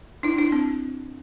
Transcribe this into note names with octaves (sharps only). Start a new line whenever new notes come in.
D4 E4
D4 E4
C4